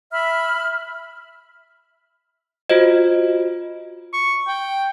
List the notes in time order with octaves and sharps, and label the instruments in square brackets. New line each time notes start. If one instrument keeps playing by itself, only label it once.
[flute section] E5 B5 F6
[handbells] F4 F#4 C5 D#5
[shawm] C#6
G5